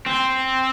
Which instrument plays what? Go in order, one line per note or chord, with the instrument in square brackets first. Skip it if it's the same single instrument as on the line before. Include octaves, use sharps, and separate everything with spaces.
[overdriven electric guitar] C4